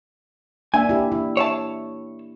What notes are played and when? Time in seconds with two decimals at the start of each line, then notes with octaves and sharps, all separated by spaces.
0.74 A#3 D4 E5 G#5
0.89 E4 G4
1.12 E4
1.37 C#5 E5 A5